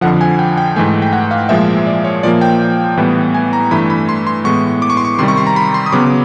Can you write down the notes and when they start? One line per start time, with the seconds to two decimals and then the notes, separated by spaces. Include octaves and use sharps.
0.01 F2 D3 F3 F#5
0.21 G#5
0.39 G5
0.58 G5
0.76 G#2 E3 A3 G#5
1.02 G5
1.13 F#5
1.31 F5
1.49 A#2 F3 G#3 E5
1.87 D5
2.04 C#5
2.23 A#2 F3 A#3 D5
2.41 G5
2.97 A2 E3 G3 B3
3.34 G#5
3.53 A#5
3.71 G2 E3 A3 B5
3.90 B5
4.09 C6
4.27 C6
4.45 A2 E3 G#3 B3 C#6
4.82 D6
4.90 C#6
4.97 C6
5.05 C#6
5.19 C3 D#3 G3 C6
5.28 C#6
5.37 C6
5.47 A#5
5.56 B5
5.74 C6
5.86 D#6
5.92 C#3 F#3 B3 D6